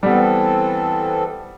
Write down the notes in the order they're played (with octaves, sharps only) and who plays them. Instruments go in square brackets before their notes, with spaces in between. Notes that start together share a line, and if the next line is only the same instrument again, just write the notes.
[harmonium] E3 C4 A4 [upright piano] G3 B3